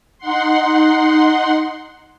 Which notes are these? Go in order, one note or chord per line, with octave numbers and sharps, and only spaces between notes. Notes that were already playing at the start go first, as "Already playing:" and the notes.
D#4 F#5 C6